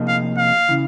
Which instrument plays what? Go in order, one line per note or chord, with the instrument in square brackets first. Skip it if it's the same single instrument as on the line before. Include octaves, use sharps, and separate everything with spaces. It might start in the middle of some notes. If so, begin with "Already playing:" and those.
Already playing: [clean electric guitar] C3 F3 A#3 D#4 G#4
[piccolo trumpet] F5
F5
[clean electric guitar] C#3 E3